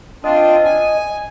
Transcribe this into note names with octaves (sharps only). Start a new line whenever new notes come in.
C4 D4 F4 D#5
G#5